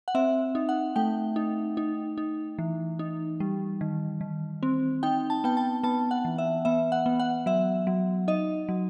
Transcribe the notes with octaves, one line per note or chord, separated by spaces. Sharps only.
F#5
C4 E5
D#4
F#5
A3 G5
D#4
D#4
D#4
E3
D#4
G3
D#3
D#3
C4
D#4 G5
A5
B3 G5
A5
B3 A5
F#5
E3
E5
B3 E5
F#5
B3
F#5
F#3 E5
F#3
D#4 D#5
F#3